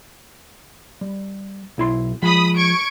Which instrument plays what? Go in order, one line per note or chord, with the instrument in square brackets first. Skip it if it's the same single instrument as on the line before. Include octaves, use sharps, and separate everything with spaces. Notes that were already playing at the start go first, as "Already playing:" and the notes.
[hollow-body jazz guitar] G3
B1 E4 C6
[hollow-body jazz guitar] F3 G#3 [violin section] B5 D#6
[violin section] C#6 G#6 D7